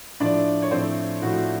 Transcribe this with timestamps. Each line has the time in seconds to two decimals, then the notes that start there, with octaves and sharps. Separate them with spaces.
0.20 A2 F3 A3 D4 D5
0.62 C#5
0.71 A2 F3 A3 C4 C5
1.22 A2 F3 A3 F#4